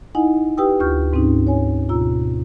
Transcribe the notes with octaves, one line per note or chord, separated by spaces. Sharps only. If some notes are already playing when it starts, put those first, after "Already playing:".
D#4 E4 D#5 F#5 G#5
G4 B4 G5 D#6 E6
D2 F4 C#6 F6 G6
G#2 C4 C#4 D#4
C#5 G#5
B2 F4 A#5 E6